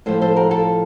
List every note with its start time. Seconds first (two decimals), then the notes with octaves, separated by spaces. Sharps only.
0.06 A2 F3 A4 C5
0.22 A4 C5
0.36 F#4 A#4
0.51 F4 A4